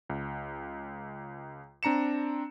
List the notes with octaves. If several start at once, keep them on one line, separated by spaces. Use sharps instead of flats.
C#2
C4 D4 A#5 C#7 E7